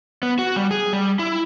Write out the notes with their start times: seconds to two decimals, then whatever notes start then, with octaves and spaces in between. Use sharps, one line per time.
0.23 B3
0.39 F#4
0.56 G3
0.71 G#4
0.93 G3
1.19 E4